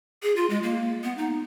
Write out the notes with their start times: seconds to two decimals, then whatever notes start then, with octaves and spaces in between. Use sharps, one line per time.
0.22 G#4
0.36 F4
0.50 G#3
0.63 A#3
1.03 B3
1.17 D#4